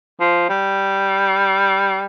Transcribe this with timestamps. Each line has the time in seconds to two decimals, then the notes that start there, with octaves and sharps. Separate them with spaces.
0.20 F3
0.49 G3